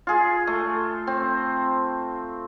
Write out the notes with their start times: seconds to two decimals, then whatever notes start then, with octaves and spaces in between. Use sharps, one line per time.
0.07 F4 G#4
0.47 A3
1.07 C4